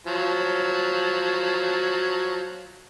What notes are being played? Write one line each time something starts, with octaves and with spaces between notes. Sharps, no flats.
F3 F#3